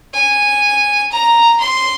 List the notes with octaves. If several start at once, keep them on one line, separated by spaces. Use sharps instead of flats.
G#5
A#5
C6